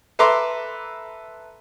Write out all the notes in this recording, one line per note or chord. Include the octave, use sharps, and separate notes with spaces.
A4 B4 E5 A#5 C6 D6